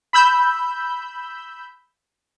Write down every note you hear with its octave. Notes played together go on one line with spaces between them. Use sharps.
B5 E6 G6